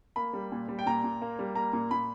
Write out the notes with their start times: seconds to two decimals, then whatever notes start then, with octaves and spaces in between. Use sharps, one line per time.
0.16 A#3 B5
0.33 G3
0.52 A#2
0.68 G3
0.79 G5
0.86 A#2 A#5
1.04 A#2
1.22 A#3
1.39 G3
1.55 A#3 A#5
1.73 A#2
1.91 A#2 B5